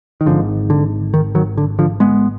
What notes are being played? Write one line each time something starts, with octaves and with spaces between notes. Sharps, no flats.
D#3
G#1 G#2 D3 F3
D3
D#3
D#3 F#3
D3
D3 F3
G#3 B3